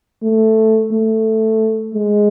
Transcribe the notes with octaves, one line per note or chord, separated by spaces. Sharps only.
A3
A3
G#3